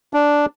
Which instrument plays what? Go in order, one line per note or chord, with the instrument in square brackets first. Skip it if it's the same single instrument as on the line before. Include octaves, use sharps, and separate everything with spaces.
[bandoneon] D4